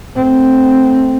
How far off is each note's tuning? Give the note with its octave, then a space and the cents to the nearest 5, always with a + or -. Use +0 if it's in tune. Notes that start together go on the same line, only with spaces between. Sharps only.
A3 +0 C4 +0